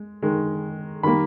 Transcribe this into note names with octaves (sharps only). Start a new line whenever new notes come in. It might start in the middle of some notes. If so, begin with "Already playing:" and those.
Already playing: G#3
D#3 G#3
D#3 G3 A#3 B5